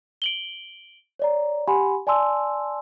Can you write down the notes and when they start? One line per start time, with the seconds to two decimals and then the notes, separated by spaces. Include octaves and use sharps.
0.22 D7 F#7 G7
1.19 C#5 D5 A#5
1.68 G4 F#5 G#5 B5 C6
2.07 D5 G#5 A5 C6 E6